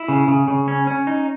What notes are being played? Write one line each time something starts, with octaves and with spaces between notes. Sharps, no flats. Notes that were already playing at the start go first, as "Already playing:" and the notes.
Already playing: E4
C#3
C#3
C#3
C#4
C#4
D#4